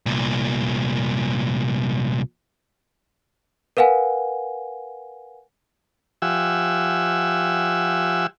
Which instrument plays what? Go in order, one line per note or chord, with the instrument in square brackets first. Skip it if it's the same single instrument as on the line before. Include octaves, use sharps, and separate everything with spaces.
[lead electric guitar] C2 A#2
[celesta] A#4 B4 F5 F#5 G#5
[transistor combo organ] F3 G4 E5 F#5 G#5 E6